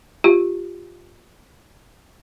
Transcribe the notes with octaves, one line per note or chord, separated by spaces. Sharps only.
F4 G4